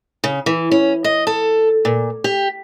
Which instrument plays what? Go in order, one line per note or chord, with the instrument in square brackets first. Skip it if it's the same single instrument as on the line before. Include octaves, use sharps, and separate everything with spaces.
[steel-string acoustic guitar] C#3
E3
C#4
D#5
A4
A#2
G4